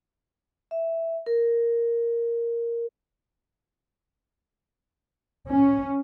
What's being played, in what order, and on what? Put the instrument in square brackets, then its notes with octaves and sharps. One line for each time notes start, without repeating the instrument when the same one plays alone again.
[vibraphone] E5
A#4
[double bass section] C#4